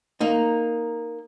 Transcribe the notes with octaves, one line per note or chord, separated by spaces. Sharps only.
A#3 D#4